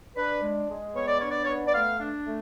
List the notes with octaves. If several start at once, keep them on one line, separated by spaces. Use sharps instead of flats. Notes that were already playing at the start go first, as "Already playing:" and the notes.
D4 B4
G#3
G#3
B3 C#5
D5
D4 C#5
D5
B3 C#5
D5
A3 F5
D4
A3